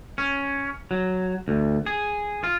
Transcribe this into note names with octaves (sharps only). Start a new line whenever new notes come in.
C#4
F#3
D2
G#4
F4